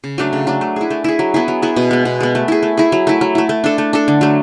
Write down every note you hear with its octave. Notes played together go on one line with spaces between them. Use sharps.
C#3
F#3 A3 D4
C#3
F#3 A3 D4
A3
E4 G#4
A3
E4 G#4
F#3
B3 E4 G#4
F#3
B3 E4 G#4
B2
G#3 B3
B2
G#3 B3
A3
E4 G#4
A3
E4 G#4
F#3
A3 E4
F#3
A3 E4
A3
D4 A4
A3
D4 A4
D3
F#3 A3